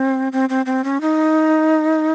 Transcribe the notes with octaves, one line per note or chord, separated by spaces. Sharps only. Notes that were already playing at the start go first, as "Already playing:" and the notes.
Already playing: C4
C4
C4
C4
C#4
D#4